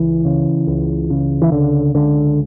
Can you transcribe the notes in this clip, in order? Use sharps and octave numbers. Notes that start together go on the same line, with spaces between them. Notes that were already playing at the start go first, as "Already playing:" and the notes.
Already playing: C#2 E3
C#3
C#2
C#3
E3
C#2 D3
C#2 D3